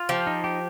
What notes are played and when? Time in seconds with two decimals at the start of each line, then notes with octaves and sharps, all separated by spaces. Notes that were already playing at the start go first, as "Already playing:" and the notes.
Already playing: F4
0.09 F3 G4
0.27 D#4
0.44 G4